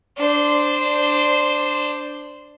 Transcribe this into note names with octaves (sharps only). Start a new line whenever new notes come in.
D4 C5